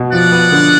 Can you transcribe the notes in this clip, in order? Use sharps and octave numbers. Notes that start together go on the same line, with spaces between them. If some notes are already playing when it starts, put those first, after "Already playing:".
Already playing: B2
F3 D5 F#5
B3
D3